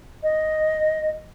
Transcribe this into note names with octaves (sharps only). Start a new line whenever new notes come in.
D#5